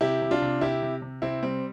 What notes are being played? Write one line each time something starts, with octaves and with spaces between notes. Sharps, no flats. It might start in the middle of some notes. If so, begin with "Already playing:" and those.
C3 E4 G4
C3
D4 F4
C3
C3 E4 G4
C3
C3
C3 C4 E4
G3 C4